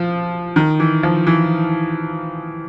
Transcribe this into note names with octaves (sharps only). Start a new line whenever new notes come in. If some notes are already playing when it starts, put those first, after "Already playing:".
Already playing: F3
D#3
E3
F3
E3